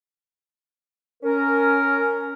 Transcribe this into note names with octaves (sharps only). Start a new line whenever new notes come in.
C#4 A#4